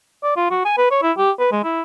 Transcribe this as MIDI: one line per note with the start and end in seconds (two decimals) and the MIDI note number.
0.24 0.31 74
0.37 0.50 65
0.51 0.64 66
0.65 0.75 80
0.78 0.87 71
0.91 0.99 73
1.02 1.12 64
1.18 1.31 67
1.39 1.50 71
1.52 1.61 56
1.64 1.82 64